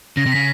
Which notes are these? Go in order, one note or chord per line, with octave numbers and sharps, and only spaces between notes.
C#3 A#6
C3
C#3 B6